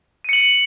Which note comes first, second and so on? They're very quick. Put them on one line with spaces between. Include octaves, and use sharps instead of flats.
D#7 C#7 F#7